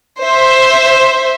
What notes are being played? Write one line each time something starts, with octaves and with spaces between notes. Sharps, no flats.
C5 E5